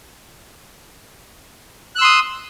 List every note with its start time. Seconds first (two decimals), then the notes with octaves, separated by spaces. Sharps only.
1.95 F#6
1.98 E6
2.01 C6
2.04 D#6